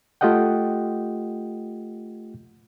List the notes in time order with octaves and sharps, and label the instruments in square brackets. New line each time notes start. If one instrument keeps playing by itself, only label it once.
[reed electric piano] A3 F4 G4 D#5 F#5 G5